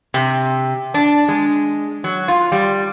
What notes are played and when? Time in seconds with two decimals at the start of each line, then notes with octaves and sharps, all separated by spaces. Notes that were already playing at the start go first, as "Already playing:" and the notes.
0.14 C3
0.94 D4
1.28 G#3
2.04 F#3
2.28 F4
2.52 G3